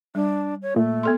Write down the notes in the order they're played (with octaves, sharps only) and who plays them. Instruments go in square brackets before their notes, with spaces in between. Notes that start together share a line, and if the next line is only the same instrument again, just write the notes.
[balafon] G3 [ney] D4
[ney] C#5
[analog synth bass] A#2 [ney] A3
[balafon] B3 A4 C6